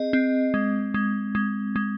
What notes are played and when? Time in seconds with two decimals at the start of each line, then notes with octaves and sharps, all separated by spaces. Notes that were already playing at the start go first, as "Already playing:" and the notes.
Already playing: C4 G#4 D#5
0.13 C4
0.54 G#3
0.94 G#3
1.35 G#3
1.76 G#3